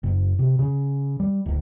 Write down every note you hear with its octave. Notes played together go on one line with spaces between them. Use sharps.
F#1
C3
C#3
G3
D1